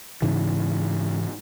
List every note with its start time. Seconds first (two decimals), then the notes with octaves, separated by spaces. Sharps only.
0.22 G#2 C#3 E3